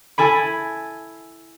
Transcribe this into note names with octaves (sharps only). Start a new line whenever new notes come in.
E4 A4 G#5 B5